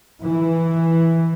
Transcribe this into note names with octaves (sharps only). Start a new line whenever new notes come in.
E3